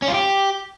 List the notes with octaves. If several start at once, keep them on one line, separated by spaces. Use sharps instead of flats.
C#4
F4
G4